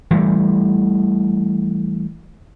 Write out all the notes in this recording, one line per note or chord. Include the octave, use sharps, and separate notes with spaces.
E3 G3 A3